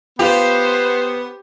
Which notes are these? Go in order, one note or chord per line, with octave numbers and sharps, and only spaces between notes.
B3 F4 G4 C5 F5